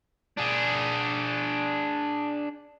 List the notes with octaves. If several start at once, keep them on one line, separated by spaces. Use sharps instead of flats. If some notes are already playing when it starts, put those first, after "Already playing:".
D4 G#4